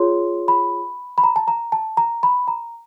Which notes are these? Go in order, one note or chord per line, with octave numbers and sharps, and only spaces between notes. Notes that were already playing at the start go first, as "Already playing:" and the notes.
Already playing: F4 G#4 C#5 C6
B5
B5
A#5
A5
A#5
A5
A#5
B5
A#5